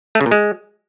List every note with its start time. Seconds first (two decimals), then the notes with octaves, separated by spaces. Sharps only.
0.15 A3
0.21 C#3
0.26 A#2
0.31 G#3